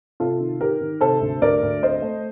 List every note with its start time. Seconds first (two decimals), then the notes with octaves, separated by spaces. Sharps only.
0.20 C3 F4 A4
0.40 D#3
0.60 D#3 G4 A#4
0.81 D#3
1.01 C3 A4 C5
1.21 D2
1.42 D2 A#4 D5
1.63 D2
1.83 C4 C5 D#5
2.02 A3